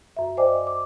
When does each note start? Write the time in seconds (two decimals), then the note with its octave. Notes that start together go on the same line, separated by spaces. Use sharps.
0.17 F#2 E5
0.37 C5 D5 D#5 G5 G#5 D6
0.67 D6